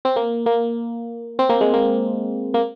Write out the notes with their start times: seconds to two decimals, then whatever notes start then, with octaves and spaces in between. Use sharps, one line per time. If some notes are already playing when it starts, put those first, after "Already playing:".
0.05 C4
0.16 A#3
0.46 A#3
1.39 C4
1.49 A#3
1.61 G#3
1.74 A#3
2.54 A#3